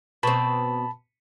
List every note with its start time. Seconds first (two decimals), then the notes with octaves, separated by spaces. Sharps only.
0.23 B2 C4 A5 B5